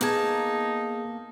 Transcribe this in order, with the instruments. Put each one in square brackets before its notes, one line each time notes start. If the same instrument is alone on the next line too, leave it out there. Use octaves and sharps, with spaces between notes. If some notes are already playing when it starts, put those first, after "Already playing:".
[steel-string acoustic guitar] A#3 A5 [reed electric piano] B3 G#4 G#6 [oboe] D#4